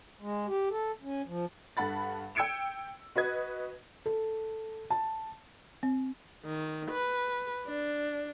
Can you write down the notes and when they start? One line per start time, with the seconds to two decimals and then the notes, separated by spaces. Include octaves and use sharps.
0.21 G#3
0.47 G4
0.70 A4
1.02 C#4
1.27 F3
1.77 G2 A4 F#5 B5 A6
2.35 G5 E6 G#6 C#7 D7 E7
3.15 F#4 B4 D#5 G#6
4.06 A4
4.90 A5
5.83 C4
6.45 D#3
6.91 B4
7.66 D4